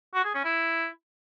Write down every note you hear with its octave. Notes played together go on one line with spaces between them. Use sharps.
F#4
G#4
C#4
E4